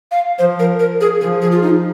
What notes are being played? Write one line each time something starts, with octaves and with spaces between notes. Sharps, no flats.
F5
F3 C5
A#4
A#4
G#4
F3 G#4
G#4
F4
D#4